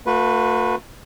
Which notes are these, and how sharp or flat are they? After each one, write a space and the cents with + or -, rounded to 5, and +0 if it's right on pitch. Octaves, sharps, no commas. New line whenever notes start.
A3 +45 F#4 -35 B4 +0